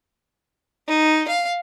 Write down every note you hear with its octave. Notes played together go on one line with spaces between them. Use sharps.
D#4
F5